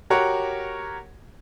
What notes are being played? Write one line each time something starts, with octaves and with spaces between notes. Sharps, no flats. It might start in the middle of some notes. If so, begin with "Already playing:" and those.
F#4 G4 A#4 C#5 F#5